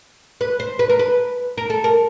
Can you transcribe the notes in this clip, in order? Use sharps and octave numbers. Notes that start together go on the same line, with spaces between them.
B4
C5
B4
A#4
B4
A#4
A4
A#4